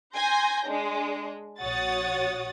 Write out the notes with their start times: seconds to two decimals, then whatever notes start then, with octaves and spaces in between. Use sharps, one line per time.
0.15 G#5 C6 G6 A#6
0.67 G#3 D4
1.62 A#1 F#4 C#5 F#5 D#6 A6